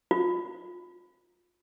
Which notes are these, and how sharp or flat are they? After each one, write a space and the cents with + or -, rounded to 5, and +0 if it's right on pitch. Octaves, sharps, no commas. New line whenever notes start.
F4 +20